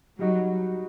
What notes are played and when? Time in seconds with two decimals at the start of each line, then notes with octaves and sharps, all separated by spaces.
0.19 F#3 G3 D#4 F#4